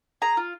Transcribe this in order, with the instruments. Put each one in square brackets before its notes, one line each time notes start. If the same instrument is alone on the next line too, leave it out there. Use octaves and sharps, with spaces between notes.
[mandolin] G#4 A#5
F4